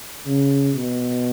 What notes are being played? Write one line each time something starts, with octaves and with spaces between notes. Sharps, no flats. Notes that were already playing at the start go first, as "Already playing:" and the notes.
C#3
B2